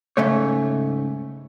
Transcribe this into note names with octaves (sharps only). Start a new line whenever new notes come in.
G#2 C#3 A3 C#5